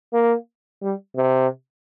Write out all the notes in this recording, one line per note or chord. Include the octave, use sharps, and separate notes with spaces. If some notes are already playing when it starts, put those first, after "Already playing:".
A#3
G3
C3